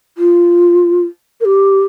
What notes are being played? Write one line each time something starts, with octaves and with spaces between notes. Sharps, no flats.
F4
A#4
G4